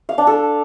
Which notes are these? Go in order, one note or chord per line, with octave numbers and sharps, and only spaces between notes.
F5
D4
A4